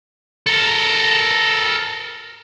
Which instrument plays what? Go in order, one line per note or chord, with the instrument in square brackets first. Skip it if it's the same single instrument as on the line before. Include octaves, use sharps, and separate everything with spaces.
[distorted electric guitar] A4 A#4